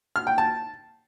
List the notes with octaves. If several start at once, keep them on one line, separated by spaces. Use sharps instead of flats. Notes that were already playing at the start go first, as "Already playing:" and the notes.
F6
G5
A5